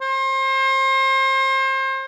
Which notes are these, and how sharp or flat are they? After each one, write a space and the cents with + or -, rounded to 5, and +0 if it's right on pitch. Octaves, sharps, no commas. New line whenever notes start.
C5 +35